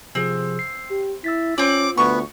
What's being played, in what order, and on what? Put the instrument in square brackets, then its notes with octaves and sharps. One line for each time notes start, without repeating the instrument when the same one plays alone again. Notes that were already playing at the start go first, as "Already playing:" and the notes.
[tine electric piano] C3 F3 G#4 [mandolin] C4
[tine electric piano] C7
[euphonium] G4
[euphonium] E4 [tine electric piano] E6 A6 B6
[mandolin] C4 D5 [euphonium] C#4 [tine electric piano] F4 [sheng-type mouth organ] D6
[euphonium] D2 [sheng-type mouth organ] B3 [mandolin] C#6